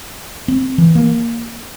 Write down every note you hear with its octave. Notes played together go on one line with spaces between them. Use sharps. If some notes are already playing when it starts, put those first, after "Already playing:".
C4
E3
A#3